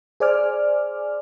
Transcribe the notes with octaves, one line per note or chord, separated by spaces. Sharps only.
G#4 C5 D5 G#5 D6 F6